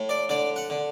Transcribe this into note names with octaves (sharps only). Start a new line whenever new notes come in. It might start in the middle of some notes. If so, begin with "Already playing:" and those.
Already playing: A2
D5
D3 D5
F#5
D3